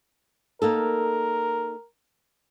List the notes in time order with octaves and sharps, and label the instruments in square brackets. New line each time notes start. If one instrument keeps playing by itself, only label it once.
[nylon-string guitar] A#3 D#4 A4 [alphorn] A#4